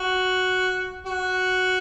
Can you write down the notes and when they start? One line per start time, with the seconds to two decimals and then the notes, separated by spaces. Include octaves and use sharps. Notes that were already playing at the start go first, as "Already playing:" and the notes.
Already playing: F#4
1.06 F#4